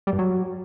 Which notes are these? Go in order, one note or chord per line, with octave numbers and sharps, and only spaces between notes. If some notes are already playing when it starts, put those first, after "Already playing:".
G3
G2
F#3